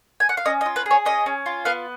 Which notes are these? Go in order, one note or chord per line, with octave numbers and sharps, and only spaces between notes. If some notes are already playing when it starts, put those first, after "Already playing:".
G#5
F#5
F5
C#4 D#5
D#5
F4
B4
G#4 C#5
C#4 D#5
C#4
F4
B3 F5